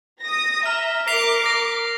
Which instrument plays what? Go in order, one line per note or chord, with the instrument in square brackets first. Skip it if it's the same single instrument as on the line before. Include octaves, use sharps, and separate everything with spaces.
[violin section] D#6 A#6
[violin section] E5 A#5 [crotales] F6
[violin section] A#4 D6 [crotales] B6 C7 F7
[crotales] A#6